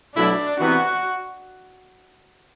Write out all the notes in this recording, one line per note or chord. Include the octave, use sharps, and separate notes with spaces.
B2 F#3 A3 D4 E4
C3 E3 B3 F#4